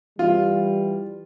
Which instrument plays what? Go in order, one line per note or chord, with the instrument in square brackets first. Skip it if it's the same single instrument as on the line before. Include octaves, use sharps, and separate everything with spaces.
[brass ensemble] E3 G3 [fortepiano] F4